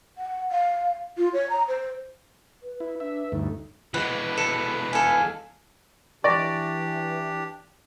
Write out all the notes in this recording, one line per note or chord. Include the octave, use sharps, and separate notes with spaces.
F#5
F5
F4
C#5
A#5
C5
B4
E4
D4 E5
D2 G2 A3 D#4
E3 G#3 B4 F#5
A4
A4 F5 G#5
E3 D4 G4 D5 C#6 A#6